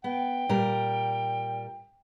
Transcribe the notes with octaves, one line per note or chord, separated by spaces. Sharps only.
B3 G5
A#2 G3 A#4